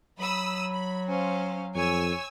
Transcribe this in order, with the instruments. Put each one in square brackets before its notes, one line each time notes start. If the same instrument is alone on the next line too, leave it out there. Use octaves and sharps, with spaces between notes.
[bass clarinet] F#3 [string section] B5 D#6 E6
[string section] B5
[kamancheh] C#4 F5 [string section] C5
[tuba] F2 [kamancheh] C#5 [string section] G#5 E6